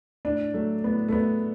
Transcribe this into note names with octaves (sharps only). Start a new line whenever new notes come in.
A2 D4
F#3 A3
A2 B3
A3
F#3 B3